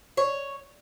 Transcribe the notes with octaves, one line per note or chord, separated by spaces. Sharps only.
C#5